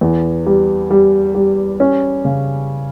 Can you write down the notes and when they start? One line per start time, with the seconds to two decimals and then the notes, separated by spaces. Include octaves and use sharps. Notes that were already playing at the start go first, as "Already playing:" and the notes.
0.01 E2
0.46 G3
0.91 G3
1.35 G3
1.80 C#4
2.25 C#3